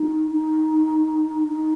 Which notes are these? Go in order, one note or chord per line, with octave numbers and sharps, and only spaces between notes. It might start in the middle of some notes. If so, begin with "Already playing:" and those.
Already playing: D#4
D#4
D#4